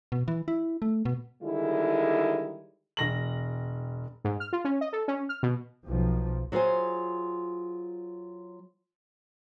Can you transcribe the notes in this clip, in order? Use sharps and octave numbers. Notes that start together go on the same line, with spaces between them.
B2
E3
E4
A3
B2
D3 D#3 G3 G#3 E4
E1 A#6 F#7
G#2
F6
F4
C#4
D#5
A4
C#4
F6
B2
B1 F3
F#3 F4 G#4 C5 G#5